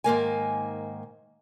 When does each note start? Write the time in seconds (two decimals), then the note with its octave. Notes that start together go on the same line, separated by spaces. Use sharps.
0.04 G#2 D#3 A#3 G#5